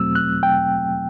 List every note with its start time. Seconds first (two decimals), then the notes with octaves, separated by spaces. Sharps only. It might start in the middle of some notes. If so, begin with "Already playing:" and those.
Already playing: E2 B2 F#3 A3 C4 E6
0.15 F#6
0.43 G5